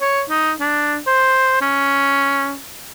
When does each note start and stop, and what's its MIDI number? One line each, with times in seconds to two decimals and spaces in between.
0.01 0.23 73
0.30 0.52 63
0.60 0.97 62
1.07 1.59 72
1.62 2.56 61